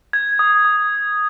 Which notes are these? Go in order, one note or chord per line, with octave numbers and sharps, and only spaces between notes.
G#6
D#6
D#6